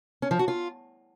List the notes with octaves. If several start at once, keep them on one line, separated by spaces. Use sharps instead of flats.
C#4
F3
F#4
F4